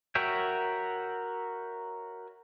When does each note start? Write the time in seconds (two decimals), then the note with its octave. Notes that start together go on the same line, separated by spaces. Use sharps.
0.15 F#4 A#4 C#5 E5 G5